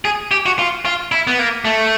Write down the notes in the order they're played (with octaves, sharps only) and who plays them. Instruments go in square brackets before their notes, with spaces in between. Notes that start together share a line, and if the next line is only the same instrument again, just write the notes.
[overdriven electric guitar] G#4
G4
F#4
F4
F4
E4
B3
A#3
A3